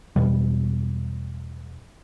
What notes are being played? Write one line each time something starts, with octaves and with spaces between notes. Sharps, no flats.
E2 B2 G3